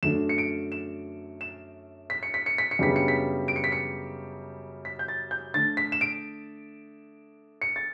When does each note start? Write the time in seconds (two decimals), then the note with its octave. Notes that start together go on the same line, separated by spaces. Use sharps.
0.03 F#2 D3 F#3 A3 D4 E7
0.29 C#7
0.38 D7
0.72 E7
1.41 E7
2.10 B6
2.23 C#7
2.34 B6
2.46 C#7
2.58 B6
2.71 C#7
2.79 F#2 C#3 G3 B3 D4 B6
2.96 C#7
3.08 B6
3.48 D7
3.56 C#7
3.64 B6
3.72 C#7
4.85 B6
4.99 G6
5.08 A6
5.31 G6
5.54 D3 A3 D4 A6
5.77 B6
5.92 E7
6.01 D7
7.62 C#7
7.76 A6